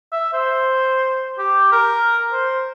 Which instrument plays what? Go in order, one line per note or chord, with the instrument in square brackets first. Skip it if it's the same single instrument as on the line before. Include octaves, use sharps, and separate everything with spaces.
[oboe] E5
C5
G4
A#4
C5